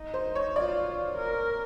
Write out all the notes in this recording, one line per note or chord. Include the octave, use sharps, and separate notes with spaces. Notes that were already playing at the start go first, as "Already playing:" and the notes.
Already playing: D#4
C5
C#5
F4 D5
A#4